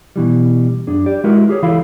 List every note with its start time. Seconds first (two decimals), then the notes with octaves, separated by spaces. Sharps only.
0.16 B2 E3 G3
0.87 F#2 D4 G#4
1.06 G4 D5
1.24 G#3 E4 F#4 A#4 B4
1.48 F4 G4 G#4 C#5
1.62 C#2 E3 E4 A4 F5 B5